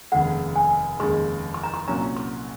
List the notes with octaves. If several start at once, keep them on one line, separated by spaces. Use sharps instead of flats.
F1 D#2 C#3 G#3 F#5
G#5
F1 D#2 C#3 G#3 C6
C6
A#5
C6
C2 A#2 F#3 C#4 A#5
C6